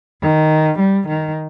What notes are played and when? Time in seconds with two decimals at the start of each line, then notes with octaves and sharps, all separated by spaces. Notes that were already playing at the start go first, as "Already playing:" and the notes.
0.22 D#3
0.79 G3
1.08 D#3